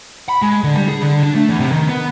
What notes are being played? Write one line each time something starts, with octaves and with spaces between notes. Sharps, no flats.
B5
G#3
D3
G3
G#4
D3
D4
A3
E2
C3
D#3
B3